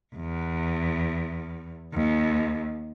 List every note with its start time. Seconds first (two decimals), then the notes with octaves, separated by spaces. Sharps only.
0.15 E2
1.93 D#2